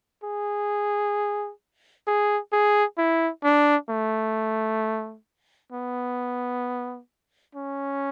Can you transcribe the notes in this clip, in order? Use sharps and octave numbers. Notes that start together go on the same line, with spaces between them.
G#4
G#4
G#4
E4
D4
A3
B3
C#4